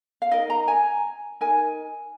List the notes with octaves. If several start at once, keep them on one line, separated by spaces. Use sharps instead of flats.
F5
D#4 A#4 D#5
A#5
G#5
D#4 A#4 G#5